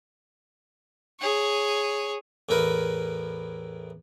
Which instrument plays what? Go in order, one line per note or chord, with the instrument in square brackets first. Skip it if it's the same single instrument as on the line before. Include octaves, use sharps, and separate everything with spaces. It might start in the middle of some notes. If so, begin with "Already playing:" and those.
[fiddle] G#4 C#5
[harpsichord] E2 A2 E4 A#4 B4